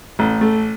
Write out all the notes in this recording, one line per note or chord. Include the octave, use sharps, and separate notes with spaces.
A1
A3